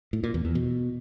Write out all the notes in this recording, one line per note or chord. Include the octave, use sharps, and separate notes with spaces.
A2
A#2
E2
E2
B2